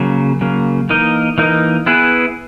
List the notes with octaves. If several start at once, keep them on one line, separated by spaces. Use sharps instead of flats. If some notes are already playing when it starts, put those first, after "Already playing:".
Already playing: C#3 F#3 A#3
C#3 F#3 A#3
E3 A#3 D#4 A#4 D#5
E3 A#3 D#4 A#4 D#5
B3 E4 G#4 B4